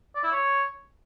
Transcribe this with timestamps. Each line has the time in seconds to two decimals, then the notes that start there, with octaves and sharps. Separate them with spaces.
0.15 D5
0.24 E4
0.32 C#5